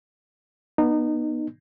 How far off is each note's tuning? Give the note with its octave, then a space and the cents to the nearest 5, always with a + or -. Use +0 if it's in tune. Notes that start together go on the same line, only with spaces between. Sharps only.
B3 -25 D#4 -25